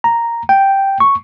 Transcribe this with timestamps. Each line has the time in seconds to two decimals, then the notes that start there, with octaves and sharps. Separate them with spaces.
0.04 A#5
0.49 G5
1.00 C#6